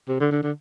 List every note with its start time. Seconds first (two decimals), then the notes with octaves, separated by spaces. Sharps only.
0.09 C3
0.21 D3
0.31 D3
0.43 D3